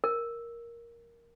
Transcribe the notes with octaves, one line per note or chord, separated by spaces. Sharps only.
A#4